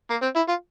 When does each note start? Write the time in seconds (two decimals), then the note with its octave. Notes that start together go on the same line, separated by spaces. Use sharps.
0.10 A#3
0.22 C4
0.35 E4
0.48 F4